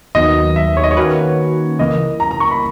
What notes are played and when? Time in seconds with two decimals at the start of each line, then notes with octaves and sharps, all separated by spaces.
0.15 D#2 D#3 F#3 B3 D#5
0.56 E5
0.77 C#5
0.84 D#5
0.91 C#5
0.97 D#3 A#3 C#4 F#4 B4
1.79 C#2 C#3 E3 A#3 D#5
2.20 A#5
2.31 A#5
2.40 C#6
2.51 B5